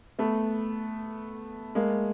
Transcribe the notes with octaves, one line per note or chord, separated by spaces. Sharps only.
A3 B3
G#3 A#3